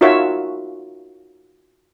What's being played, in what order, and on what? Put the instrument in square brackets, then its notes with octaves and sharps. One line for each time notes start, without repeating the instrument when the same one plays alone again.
[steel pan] D#4 F4 F#4 A#4 C#5 E5